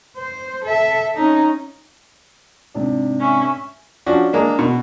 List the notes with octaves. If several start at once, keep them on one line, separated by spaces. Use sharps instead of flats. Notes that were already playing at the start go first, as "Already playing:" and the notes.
C5
A4 E5
C#4 D#4
G#2 C3 D4
C#4 E5
F3 C#4 D4 F#4
G#3 A#3 D4
B2